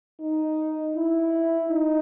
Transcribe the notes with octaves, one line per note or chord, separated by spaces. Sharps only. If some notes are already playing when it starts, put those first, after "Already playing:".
D#4
E4
D#4